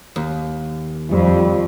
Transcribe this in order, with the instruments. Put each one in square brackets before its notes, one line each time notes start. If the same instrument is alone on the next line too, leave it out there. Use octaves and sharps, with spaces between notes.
[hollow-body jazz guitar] D#2
[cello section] F2 [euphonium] G3